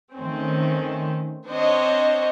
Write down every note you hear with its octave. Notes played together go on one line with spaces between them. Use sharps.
D#3 A3 C4 C#4
C4 D4 C5 C#5 D#5